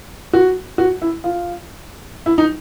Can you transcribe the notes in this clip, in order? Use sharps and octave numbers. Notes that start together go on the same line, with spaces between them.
F#4
F#4
E4
F4
E4
D#4